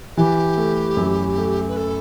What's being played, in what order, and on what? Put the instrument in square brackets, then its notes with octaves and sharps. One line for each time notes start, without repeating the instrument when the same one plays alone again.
[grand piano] E3 [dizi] G4
[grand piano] A3
F#2
A3
[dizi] B4
A4